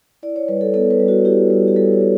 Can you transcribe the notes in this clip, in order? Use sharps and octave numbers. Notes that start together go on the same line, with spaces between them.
E4 D5
C#5
G3 B4
A4
B3 A4
B4
G3
F#4
E4 G4
G3
G4
G3 A4
C#5
G3